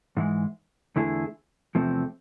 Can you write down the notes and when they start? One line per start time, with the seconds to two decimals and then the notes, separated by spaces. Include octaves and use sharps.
0.17 G#2 E3 G#3
0.96 E2 D3 A3 E4 G#4
1.75 E2 C3 F3 A3 C4